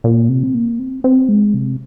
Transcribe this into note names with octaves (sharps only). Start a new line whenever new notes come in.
A#2
C3
C4
A#3
C4
C4
G#3
C3